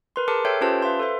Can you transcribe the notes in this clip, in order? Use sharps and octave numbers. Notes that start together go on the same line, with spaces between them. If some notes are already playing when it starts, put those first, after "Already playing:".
A#4 B4 C6
G#4 A#4 A5 D6 C#7
A4 C#5 E5 G5 G6 C7
C#4 F4 G4 B4 C5 A5
B4 E5 F5 C6
A4 B4 C5 E5